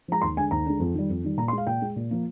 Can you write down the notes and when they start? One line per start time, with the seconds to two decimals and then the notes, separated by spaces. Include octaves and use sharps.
0.08 F3 G#3 A#5
0.22 D#2 C6
0.37 D3 G#3 G#5
0.51 D#2 A#5
0.66 D3 G#3
0.80 F2
0.94 D#3 G3
1.09 F2
1.24 D#3 G3
1.38 A#2 A#5
1.48 C6
1.52 G#3
1.58 F5
1.67 A#2 G5
1.82 G#3
1.96 A#2
2.11 F3 A#3